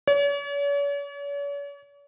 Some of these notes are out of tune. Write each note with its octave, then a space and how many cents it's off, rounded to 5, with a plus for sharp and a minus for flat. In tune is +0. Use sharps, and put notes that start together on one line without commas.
C#5 +45